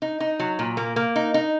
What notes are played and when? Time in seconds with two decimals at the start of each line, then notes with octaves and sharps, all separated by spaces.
0.02 D#4
0.20 D#4
0.39 F#3
0.59 A#2
0.77 A#3
0.96 A#3
1.16 D#4
1.34 D#4